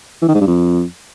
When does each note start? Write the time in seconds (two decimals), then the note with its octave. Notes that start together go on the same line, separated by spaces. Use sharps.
0.22 E3
0.28 D#3
0.35 G#2
0.41 G2
0.47 F2